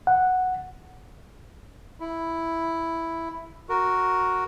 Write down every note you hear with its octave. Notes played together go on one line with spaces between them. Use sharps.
F#5
E4
F#4 A#4